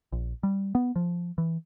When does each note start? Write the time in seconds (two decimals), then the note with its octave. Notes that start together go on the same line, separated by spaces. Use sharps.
0.12 A#1
0.43 G3
0.75 B3
0.96 F3
1.38 E3